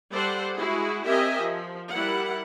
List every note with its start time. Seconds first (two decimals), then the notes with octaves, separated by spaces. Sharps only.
0.13 G3 A4 C5 D5 F#5
0.57 G#3 E4 F#4 G#4
1.06 C4 G4 A#4 D#5 E5 G#5
1.41 F3
1.92 G3 E4 A#4 F#5